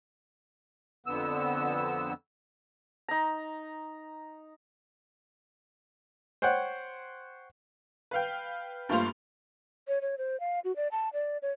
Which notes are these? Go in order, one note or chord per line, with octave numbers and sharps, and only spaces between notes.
F2 D3 B3 E6
D#4 A#5
C5 C#5 F#5 G5
B4 F5 G5
G2 A#2 A3 F4 C5 F7
C#5
C#5
C5
F5
F#4
D5
A5
D5
C#5